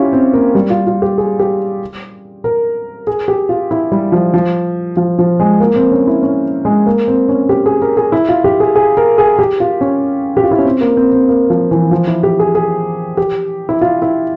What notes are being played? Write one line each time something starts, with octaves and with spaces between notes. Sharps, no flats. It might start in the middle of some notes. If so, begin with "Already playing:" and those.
Already playing: C#4 E4 F4 G4
C4
A#3
G3
F4
F4
G4
G#4
G4
A#4
G#4
G4
F4
E4
G3
F3
F3
F3
F3
G#3
A#3
C4
C#4
E4
C#4
G#3
A#3
C4
C#4
G4
G#4
A#4
G#4
E4
F4
G4
G#4
G#4
A#4
G#4
G4
F4
C#4
G4
F4
E4
C#4
C4
A#3
C4
C4
A#3
F3
E3
F3
E4
G4
G#4
G#4
G4
E4
F4
E4